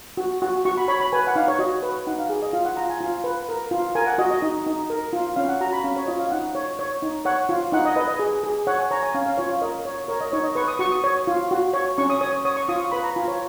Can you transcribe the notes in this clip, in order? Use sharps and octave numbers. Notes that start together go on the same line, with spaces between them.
F#4
F#4
F#4 C#6
B5
C#5 B5
B5
B4 G#5
F#5
D#4 F5
C#5
F#4 D#5
B4
D#4 F#5
F5
G#4
D#5
F4 F5
F#5
F4 A#5
G#5
F4
B4
A#4
F4
A#4 G#5
F#5
F#4 D#5
D#5
D#4
D#4
A#4
F4
C#4 F5
F#5
F#4 A#5
B5
C#4 F5
C#5
F4 D#5
F5
D#4 F#5
C#5
C#5
D#4
C#5 F#5
F4
D#4 F#5
D#5
B4 D#5
D#5
G#4
G#4
C#5 F#5
G#5
C#5 A#5
G#5
C#4 F5
F5
F4 C#5
F5
A#4 D#5
C#5
A#4 C#5
D#5
D#4 C#5
D#5
B4 C#6
D#6
F#4 C#6
D#6
C#5
F4
F#4
C#5
C#4 C#6
D#6
C#5 D#6
C#5 D#6
C#6
F4 D#6
C#6
B4 B5
A#5
F4 G#5
C#5